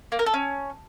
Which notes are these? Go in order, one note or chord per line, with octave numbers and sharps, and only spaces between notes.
A#3
A#4
A4
C#4